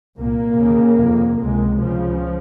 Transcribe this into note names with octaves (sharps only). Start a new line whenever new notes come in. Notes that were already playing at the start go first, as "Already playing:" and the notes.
C2 A#2 A#3
D#2 C#3
F2 C3
C#2 C3 G#3
C#2 C#3 F3